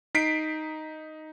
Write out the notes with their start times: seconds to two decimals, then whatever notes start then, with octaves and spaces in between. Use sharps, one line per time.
0.15 D#4 B6 C7 D7